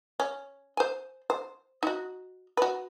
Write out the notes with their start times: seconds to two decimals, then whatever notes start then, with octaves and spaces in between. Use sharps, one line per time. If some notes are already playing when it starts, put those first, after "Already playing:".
0.20 C#4
0.77 C5 G#5
1.30 C5
1.83 D#4 F#4
2.57 F#4 B4